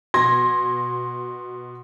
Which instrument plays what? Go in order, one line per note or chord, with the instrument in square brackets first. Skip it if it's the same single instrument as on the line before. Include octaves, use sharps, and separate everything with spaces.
[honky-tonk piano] B2 C6 G#6 A#6